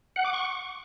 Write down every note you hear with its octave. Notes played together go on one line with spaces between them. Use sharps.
F#5
D6
C#6